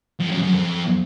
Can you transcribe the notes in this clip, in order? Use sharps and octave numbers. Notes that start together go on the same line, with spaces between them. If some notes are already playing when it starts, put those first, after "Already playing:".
F2
F#2
F#2
F2